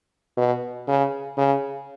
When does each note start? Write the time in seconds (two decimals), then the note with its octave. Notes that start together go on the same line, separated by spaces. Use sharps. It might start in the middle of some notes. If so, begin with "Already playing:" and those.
0.37 B2
0.88 C#3
1.38 C#3